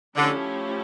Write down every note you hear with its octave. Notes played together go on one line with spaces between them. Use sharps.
D3 F3 A3 C#4 E4 G4